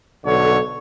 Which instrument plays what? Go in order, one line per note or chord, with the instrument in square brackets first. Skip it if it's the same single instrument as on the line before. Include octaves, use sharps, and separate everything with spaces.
[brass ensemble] B1 D3 A4 C#5